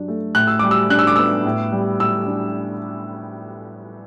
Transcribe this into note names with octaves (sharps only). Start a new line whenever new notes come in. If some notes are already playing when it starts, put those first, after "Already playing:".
Already playing: G2 F#3 D4
A3
A2 F#6
E6
G3 D6
E6
D4 F#6
E6
D6
B3 E6
A2
G3
A2 E6
D4